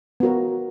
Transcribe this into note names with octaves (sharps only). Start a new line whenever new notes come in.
B3 F#4 A#4